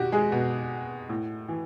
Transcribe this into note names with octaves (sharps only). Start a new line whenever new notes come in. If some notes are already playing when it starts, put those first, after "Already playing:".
Already playing: B2 F#4 G4
G#3 G#4
B2
A2
E3